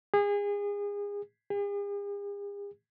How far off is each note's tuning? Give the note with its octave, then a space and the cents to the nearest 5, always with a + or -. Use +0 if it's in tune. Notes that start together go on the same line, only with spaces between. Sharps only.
G#4 -30
G#4 -45